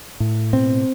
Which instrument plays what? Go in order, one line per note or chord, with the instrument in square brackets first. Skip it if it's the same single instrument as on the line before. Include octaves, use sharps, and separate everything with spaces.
[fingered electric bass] A2
B2 C4